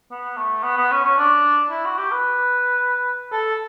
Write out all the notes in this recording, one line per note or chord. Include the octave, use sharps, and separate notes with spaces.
B3
A3
B3
B3
C#4
C#4
D4
E4
F#4
G4
B4
A4